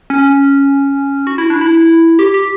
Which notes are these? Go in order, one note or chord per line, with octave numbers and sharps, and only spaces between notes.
C#4
F#4
E4
D4
E4
G4
G4